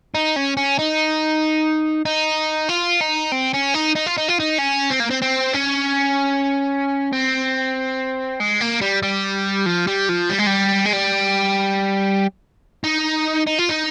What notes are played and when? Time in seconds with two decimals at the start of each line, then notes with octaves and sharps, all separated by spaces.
0.15 D#4
0.36 C#4
0.57 C#4
0.79 D#4
2.06 D#4
2.69 F4
3.01 D#4
3.32 C4
3.53 C#4
3.74 D#4
3.95 D#4
4.06 F4
4.17 D#4
4.28 F4
4.40 D#4
4.59 C#4
4.90 C4
5.00 A#3
5.11 C4
5.22 C4
5.54 C#4
7.12 C4
8.40 G#3
8.60 A#3
8.81 G3
9.03 G3
9.66 F3
9.87 G3
10.09 F3
10.29 G3
10.39 G#3
10.47 G3
10.85 G#3
10.93 G3
12.84 D#4
13.47 D#4
13.59 F4
13.69 D#4